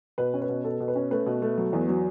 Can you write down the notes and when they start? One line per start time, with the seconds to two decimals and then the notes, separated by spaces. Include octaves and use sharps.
0.18 B2 B4
0.34 C#4
0.42 B4
0.49 B2
0.64 B2 A4
0.80 B2
0.88 B4
0.96 C#4
1.11 A3 B4
1.26 B2
1.42 A3
1.57 F#3
1.73 E2
1.88 F#3